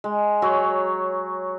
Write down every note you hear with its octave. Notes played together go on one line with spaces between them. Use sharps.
G#3
F#3 C#5